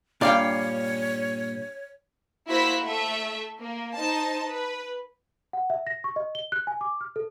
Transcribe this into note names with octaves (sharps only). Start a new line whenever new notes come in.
G2 A#2 C#5 D5 F5 G5
A#3 E4 F#4 C5 E6 B6
A3 E5
A#3
D#4 C5 A5
B4
F#5
E5
A#6
C#6
D#5
G7
F#6
G#5
D6
F6
A4